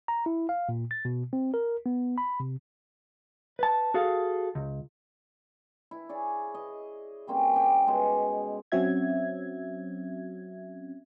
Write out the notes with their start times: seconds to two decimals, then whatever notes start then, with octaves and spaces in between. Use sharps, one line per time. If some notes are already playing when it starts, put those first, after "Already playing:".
0.08 A#5
0.26 E4
0.49 F5
0.69 A#2
0.91 A6
1.05 B2
1.33 C4
1.54 A#4
1.86 B3
2.18 B5
2.40 C3
3.59 B4 A5
3.94 F#4 G#4 A4 F5
4.55 C#2
5.91 E4
6.09 G#4 C#5 D5
6.54 D#5
7.27 G3 A#3 C4 C#4
7.53 G4 G5 B5
7.87 B2 G#3
8.72 F#3 C4 C#4 F#4 E5 G#6